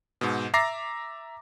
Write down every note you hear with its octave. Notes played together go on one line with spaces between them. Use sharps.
G#2 B2
E5 A#5 D6 A6 A#6 C7